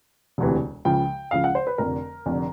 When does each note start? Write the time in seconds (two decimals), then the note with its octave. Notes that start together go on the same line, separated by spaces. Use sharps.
0.38 E1 D2 C3 E3
0.85 C#2 C#3 F3 G5
1.31 C#2 C#3 F3 F5
1.44 F#5
1.55 C5
1.67 B4
1.78 F1 F2 D3 A#4
2.26 F1 F2 D3